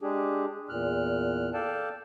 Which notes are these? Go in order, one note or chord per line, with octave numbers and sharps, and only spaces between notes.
G#3 D4 G4 G#4
E2 A#2 F6 F#6
A4 D5 F5 G5 A5